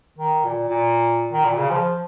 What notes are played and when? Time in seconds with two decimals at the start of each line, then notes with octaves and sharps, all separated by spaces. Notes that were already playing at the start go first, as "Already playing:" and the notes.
0.18 D#3
0.45 A#2
0.69 A#2
1.32 D#3
1.45 A#2
1.58 C#3
1.71 F3